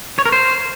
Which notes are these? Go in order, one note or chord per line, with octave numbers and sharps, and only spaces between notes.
C#5
A#4
C5